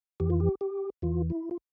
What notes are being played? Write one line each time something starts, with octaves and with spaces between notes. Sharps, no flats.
F2 E3 G4
F4
G4
G4
E2 E3 F4
E4
F4